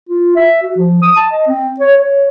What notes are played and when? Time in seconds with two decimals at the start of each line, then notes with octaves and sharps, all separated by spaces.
0.09 F4
0.36 E5
0.62 F#4
0.77 F3
1.02 D#6
1.16 A5
1.32 D#5
1.48 C4
1.80 C#5
1.97 C#5